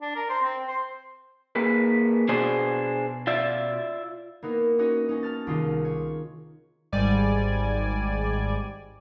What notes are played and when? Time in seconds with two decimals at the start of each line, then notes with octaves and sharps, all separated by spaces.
0.01 D4
0.16 A#4
0.30 C5
0.42 C4
0.68 C5
1.55 A#3 G#4 B4
2.29 B2 D4 G#4 C5
3.27 F4 D5 E5
4.43 A#3 B3 D#4 A#4
4.79 C#4 D#4 F#4 C#5 D#5
5.09 C#4 D#4
5.23 A5 F6 A6
5.47 C2 D#3 D#4 F4 G#4
5.85 C#5
6.92 G#1 G#2 G3 D5 G#5